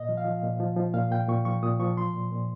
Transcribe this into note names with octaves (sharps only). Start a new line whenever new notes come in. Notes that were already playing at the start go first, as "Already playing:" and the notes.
Already playing: A#2 D#5
F3
F5
F3
A#2
F3
F3
A#2 F5
A#2 G5
A#2 C#6
F3 C#6
A#2 D#6
F3 C#6
F3 C6
A#2
A#2